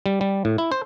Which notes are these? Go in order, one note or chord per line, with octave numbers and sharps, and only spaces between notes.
G3
G3
A2
E4
C5